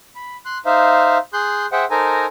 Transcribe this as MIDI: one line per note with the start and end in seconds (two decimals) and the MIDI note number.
0.16 0.37 83
0.45 0.58 84
0.45 0.58 90
0.66 1.18 63
0.66 1.18 72
0.66 1.18 76
0.66 1.18 77
1.33 1.66 68
1.33 1.66 84
1.33 1.66 90
1.33 1.66 91
1.72 1.85 68
1.72 1.85 72
1.72 1.85 76
1.72 1.85 78
1.72 1.85 79
1.91 2.26 63
1.91 2.26 69
1.91 2.26 70
1.91 2.26 72
1.91 2.26 80
1.91 2.26 82